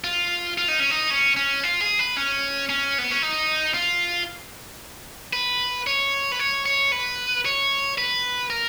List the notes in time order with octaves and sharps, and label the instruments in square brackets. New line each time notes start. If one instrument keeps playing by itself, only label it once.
[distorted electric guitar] F4
F4
D#4
C#4
D#4
C#4
C#4
F4
G#4
B4
C#4
C#4
B3
C#4
D#4
F4
B4
C#5
B4
C#5
C#5
B4
C#5
B4
A#4